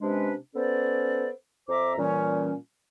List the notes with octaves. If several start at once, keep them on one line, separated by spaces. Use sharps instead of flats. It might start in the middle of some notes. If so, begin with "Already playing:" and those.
C3 G#3 C#4 D4 B4
B3 C#4 A4 C5 D5
F2 C5 E5 A#5 D6
A#2 E3 G3 C#4